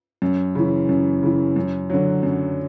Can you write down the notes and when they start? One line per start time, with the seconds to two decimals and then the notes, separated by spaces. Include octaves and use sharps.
0.22 F#2
0.55 C#3 E3
0.89 F#2
1.23 C#3 E3
1.56 F#2
1.90 D3 F#3
2.23 F#2